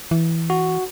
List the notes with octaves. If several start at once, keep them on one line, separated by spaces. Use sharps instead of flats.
E3
F#4